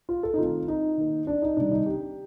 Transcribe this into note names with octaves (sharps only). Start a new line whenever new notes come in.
F4
A4
D#4
D#3 A3 C4 F4
D#4
D#3 A#3
D4
D#4
C3 D#3 G3 D4
D#4
G4